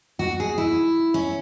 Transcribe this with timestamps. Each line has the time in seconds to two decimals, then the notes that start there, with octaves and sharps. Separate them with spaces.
0.19 F#4
0.40 G#4
0.58 E4
1.14 C#4